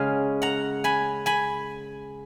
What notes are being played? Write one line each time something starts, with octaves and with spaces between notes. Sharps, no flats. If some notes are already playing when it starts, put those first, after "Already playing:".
Already playing: C#3 G#3 C#4 F5 G#5
F#5 A#5
G#5 B5
G#5 B5